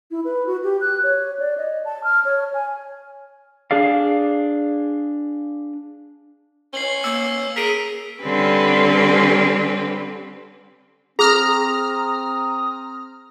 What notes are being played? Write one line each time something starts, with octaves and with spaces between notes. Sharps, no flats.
E4
B4
F#4
G4
F#6
C#5
D5
D#5
A5
F6
C#5
G#5
D4 G#4 D5 F5
C#4 C7 F#7 G7
A#3 E6
G#4 A#4 B6 D7 D#7
D3 G3 C4 C#4 G4 B4
C4 G#4 A#5 D#6 F6